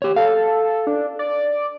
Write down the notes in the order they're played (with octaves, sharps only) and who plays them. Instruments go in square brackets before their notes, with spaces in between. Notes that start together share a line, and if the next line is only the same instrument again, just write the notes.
[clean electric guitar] G4 C#5
[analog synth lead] A4 [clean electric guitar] F5
[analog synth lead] D4
D5